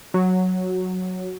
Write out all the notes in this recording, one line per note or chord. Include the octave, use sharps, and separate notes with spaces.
F#3